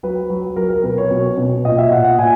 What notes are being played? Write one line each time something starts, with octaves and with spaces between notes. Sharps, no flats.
F#3 B4
F#3
F#3 A#4
A#4
B2 B4
C#5
B2
B2
A#2 D#5
E5
A#2 F#5
F#5
A#2 G#5